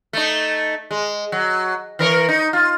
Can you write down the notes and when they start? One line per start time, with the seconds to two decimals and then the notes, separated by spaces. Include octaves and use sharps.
0.13 A3 D#4
0.91 G#3
1.32 F#3
1.99 E3 A#4 C#5
2.29 D#4
2.53 F4